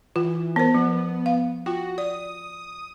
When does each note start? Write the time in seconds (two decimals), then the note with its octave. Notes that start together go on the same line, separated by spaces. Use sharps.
0.16 E3 F4
0.56 B3 A#4 C5
0.74 F3 B3
1.26 F5
1.66 F4 F#4 G5
1.98 D5 D#6